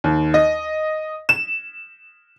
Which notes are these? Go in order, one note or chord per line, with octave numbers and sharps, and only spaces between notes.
D#2
D#5
E7